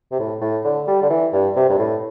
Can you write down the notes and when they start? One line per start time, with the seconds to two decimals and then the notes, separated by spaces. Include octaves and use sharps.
0.12 C3
0.19 A2
0.42 A2
0.65 D3
0.87 G3
1.02 D3
1.10 E3
1.33 G2
1.56 C3
1.69 G2
1.79 A2